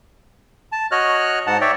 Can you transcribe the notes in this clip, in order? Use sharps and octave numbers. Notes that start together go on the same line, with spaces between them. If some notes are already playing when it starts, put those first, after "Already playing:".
A5
F#4 C#5 D#5 F6 F#6
G#2 F#5 A5
C#5 D5 E5 G5